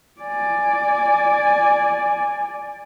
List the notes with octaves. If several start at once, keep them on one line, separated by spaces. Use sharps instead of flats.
D5 G#5